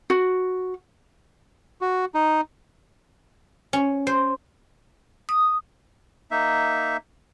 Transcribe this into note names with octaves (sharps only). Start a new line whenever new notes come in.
F#4
F#4
D#4
C#4
C5
D#6
A#3 D#4 E5